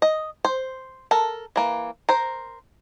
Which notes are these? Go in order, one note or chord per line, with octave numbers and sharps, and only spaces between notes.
D#5
C5
A4 A#4
E3 A#3
A#4 C5